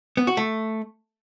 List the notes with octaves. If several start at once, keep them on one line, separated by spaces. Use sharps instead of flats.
B3
F#4
A3